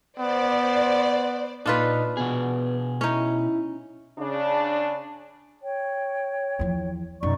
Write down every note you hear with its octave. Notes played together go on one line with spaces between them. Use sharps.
B3 C5 D5
A#2 D4 D#4 F4 B4
B2 B3 G#4
C#4 D#4 E4
C#3 D4
C#5 G5
E2 F3
F#2 B2 D#4 D5 C#6